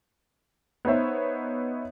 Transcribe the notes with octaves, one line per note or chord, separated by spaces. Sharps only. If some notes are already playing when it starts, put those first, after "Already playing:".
B3 D#4 C5 C#5 E5